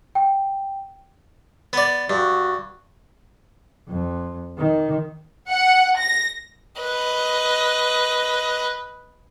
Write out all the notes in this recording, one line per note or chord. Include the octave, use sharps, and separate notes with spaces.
G5
B3 D5
G2 F#4
F2
D#3
F#5
A#6
B4 D#5